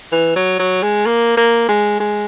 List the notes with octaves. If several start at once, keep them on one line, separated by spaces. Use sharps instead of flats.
E3
F#3
F#3
G#3
A#3
A#3
G#3
G#3